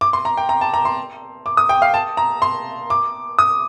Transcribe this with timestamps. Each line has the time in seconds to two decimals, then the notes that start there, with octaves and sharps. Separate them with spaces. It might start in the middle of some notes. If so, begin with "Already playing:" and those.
0.01 D6
0.13 C6
0.25 A#5
0.37 G5
0.49 A#5
0.61 A5
0.74 A#5
0.85 C6
1.46 D6
1.57 D#6
1.69 G5
1.82 F5
1.94 A5
2.17 A#5
2.42 C6
2.90 D6
3.39 D#6